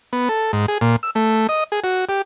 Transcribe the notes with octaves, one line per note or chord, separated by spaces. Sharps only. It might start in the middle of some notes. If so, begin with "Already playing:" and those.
B3
A4
G#2
G#4
A#2
E6
A3
D#5
G#4
F#4
G4